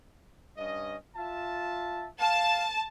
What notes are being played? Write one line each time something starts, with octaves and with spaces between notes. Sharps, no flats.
G2 C#4 D#5
F4 E5 A5
F5 A5